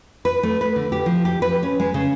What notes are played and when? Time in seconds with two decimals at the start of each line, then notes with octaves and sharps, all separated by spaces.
0.25 B4
0.43 A3
0.61 B4
0.76 D3
0.92 G4
1.06 F3
1.25 G4
1.42 B4
1.63 C#4
1.80 G#3
1.94 C#3